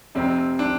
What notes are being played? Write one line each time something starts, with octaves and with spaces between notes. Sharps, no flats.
F1 F2 C3 C4
D4